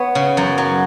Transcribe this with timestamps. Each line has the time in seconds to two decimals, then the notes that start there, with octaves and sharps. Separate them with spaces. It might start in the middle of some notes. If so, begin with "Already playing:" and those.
Already playing: B3 C#5
0.15 C#3
0.37 F#2
0.58 F#3